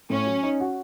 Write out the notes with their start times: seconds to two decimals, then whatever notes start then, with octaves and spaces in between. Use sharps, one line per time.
0.10 A2 C#4
0.26 F#3
0.43 D#4
0.60 F#4